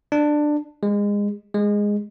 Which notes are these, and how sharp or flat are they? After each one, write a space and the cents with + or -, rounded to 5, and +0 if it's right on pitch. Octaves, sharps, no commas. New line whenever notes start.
D4 +15
G#3 -25
G#3 -10